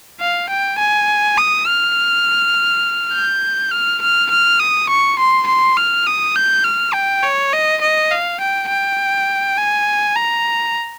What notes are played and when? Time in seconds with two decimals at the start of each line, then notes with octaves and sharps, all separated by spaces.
0.21 F5
0.50 G5
0.79 G#5
1.38 D#6
1.67 F6
3.13 G6
3.71 F6
4.02 F6
4.30 F6
4.60 D#6
4.89 C#6
5.19 C6
5.47 C6
5.77 F6
6.07 D#6
6.36 G6
6.64 F6
6.94 G5
7.23 C#5
7.53 D#5
7.82 D#5
8.11 F5
8.40 G5
8.69 G5
9.58 G#5
10.16 A#5